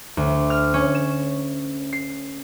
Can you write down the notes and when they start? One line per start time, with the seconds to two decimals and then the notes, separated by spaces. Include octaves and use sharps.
0.17 D2
0.50 F6
0.74 C#4
0.95 E7
1.93 C7